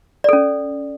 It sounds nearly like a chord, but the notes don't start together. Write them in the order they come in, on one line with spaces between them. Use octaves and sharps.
D5 A4 C#4